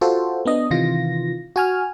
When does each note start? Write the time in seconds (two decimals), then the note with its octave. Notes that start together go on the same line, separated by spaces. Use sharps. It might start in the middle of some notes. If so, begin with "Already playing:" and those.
0.01 F4 F#4 A4 C5
0.45 B3 D4 D#5
0.70 C3 D#3 E3 F4 A#6
1.56 F#4 G#5 F6